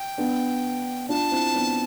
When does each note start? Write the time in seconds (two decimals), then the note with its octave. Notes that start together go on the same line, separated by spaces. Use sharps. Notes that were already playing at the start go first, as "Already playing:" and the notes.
Already playing: G5
0.18 B3 D4
1.09 D4 F4 A5
1.31 C4 E4
1.54 B3 D4